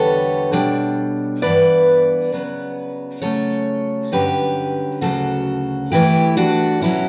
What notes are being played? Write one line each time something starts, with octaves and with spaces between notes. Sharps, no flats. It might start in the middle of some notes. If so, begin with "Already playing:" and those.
Already playing: E2 D3 G3 B3 A4 C#5
B2 G3 D4
G2 E3 B3 D4 B4 D5
C#3 F#3 B3
C#3 F#3 A3 C#4 A4 C#5
G2 D3 F#3 C#4 G4 B4
D2 C#3 F#3 F#4 A4
G2 E3 A3 E4 G4
D4 F#4
B2 F#3 C#4 E4